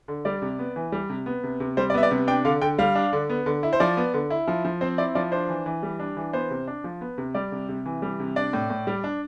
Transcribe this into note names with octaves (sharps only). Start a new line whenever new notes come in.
D3
G3 D5
C3
B3
E3
G3
C3
B3
C3
C3
G3 C5
D5
B3 E5
D5
C3
D4 G5
D3 F5
D3 G5
G3 F5
D4
D3
B3
D3
E4
C5
F3 D5
B3
D3
E4
F3
F3
C4 C5
E4 D5
F3 D5
D4 C5
E3
E3
G3
D4
E3
B3 C5
C3
D4
F3
B3
C3
G3 D5
C3
C3
E3
G3
C3
D4 D5
A2
A2
G3
D4